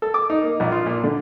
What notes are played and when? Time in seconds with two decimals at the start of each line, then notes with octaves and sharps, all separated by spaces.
0.02 A4
0.14 D6
0.30 D#4
0.43 A#3
0.60 A#1
0.72 F4
0.86 A#2
1.04 D3